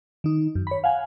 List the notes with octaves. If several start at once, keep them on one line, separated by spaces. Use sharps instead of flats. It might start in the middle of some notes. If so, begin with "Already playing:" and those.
D#3 D#4
F#2
C#5 B5
F5 F#5 G#5